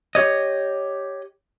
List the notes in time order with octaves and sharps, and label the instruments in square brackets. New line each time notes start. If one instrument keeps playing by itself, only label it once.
[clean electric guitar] G4 C#5 D#5